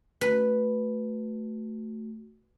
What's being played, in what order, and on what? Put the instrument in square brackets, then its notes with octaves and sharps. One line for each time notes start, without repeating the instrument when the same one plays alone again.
[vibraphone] A3 F#4 [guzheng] B4